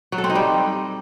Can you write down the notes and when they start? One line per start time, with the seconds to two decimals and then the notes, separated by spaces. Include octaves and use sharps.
0.12 F#3
0.18 A4
0.24 C4
0.30 D#4
0.35 G3